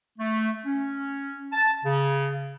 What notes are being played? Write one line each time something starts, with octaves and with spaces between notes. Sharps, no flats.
A3
C#4
A5
C#3